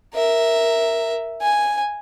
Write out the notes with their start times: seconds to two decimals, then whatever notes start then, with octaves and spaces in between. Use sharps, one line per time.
0.14 A#4 E5
1.42 G#5